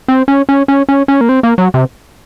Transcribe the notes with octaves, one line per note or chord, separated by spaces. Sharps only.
C4
C#4
C#4
C#4
C#4
C#4
A#3
C4
A#3
F#3
C3